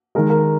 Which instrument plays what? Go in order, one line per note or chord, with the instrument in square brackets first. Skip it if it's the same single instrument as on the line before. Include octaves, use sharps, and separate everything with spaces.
[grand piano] D#3 G#3 A#4
A#4